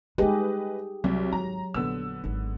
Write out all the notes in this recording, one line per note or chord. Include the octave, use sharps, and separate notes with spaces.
G#3 D#4 G4 G#4 B4 D#5
C2 F#3
G#1 A#5
A#1 D3 B3 E6
G#1 G#2